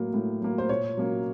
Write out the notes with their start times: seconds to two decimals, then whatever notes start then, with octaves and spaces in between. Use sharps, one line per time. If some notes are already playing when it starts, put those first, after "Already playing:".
Already playing: A2 F#3 A#3
0.14 A2
0.42 F#3 A#3
0.58 C5
0.69 A#2 C#5
0.97 F#3 A#3 C#4